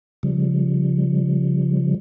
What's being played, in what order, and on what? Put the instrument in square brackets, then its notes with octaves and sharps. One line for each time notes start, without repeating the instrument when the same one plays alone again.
[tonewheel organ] C#3 F3 G3